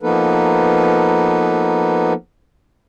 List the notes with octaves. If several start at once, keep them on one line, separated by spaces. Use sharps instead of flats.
F3 A#3 B3 D#4 A4 B4